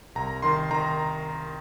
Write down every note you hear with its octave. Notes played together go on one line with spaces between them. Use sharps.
C2 A#5
D#3 C6
D#3 A#5